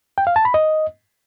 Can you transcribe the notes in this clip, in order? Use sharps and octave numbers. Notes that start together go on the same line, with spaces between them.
G5
F5
A5
B5
D#5